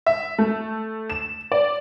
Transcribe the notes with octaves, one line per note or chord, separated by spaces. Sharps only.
E5
A3
E7
D5